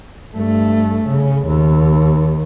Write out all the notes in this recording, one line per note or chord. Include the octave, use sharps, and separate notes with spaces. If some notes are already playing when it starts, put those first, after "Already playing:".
G2 A3
C#3
D#2